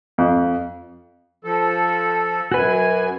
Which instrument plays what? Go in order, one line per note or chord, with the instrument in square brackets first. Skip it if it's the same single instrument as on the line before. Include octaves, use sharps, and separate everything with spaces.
[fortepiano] F2
[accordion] F3 A4
[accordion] F#2 G#5 [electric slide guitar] F#4 B4